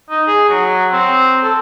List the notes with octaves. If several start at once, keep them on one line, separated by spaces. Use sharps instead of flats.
D#4
G#4
F#3
C4
A4